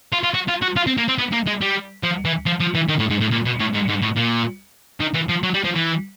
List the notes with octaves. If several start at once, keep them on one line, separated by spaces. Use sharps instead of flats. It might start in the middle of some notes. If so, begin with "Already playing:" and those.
F4
F4
F#4
F4
F#4
F4
C4
A#3
C4
B3
A#3
G#3
G3
F3
E3
F3
F3
E3
D#3
A2
G#2
A2
A#2
B2
A2
G#2
G#2
A2
A#2
D#3
E3
F3
F#3
G3
F3
E3